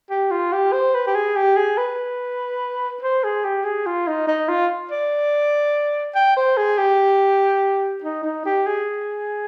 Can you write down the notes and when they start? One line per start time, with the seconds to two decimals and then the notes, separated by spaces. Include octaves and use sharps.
0.10 G4
0.31 F4
0.52 G4
0.73 C5
0.95 B4
1.07 G4
1.15 G#4
1.36 G4
1.57 G#4
1.78 B4
3.02 C5
3.24 G#4
3.44 G4
3.65 G#4
3.86 F4
4.07 D#4
4.28 D#4
4.49 F4
4.91 D5
6.15 G5
6.37 C5
6.57 G#4
6.78 G4
8.04 D#4
8.24 D#4
8.46 G4
8.67 G#4